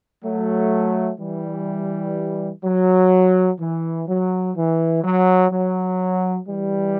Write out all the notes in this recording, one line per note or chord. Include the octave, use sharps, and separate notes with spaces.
F#3 A3
E3 G3
F#3
E3
F#3
E3
F#3
F#3
E3 G3